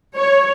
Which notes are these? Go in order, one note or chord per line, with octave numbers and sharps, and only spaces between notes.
C#5